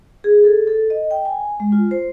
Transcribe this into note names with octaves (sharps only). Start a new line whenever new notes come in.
G#4
A4
A4
D#5
G5
G#5
G#3
F4
C5